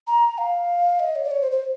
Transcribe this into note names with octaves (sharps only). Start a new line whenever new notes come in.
A#5
F5
D#5
C#5
D5
C#5
C5
C5